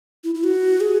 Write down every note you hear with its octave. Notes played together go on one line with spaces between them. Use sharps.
E4
E4
F#4
G#4